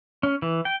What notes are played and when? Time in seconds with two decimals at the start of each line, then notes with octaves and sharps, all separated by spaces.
0.23 C#4
0.42 E3
0.65 G5